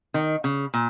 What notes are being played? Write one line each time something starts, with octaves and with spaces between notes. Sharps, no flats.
D#3
C#3
A#2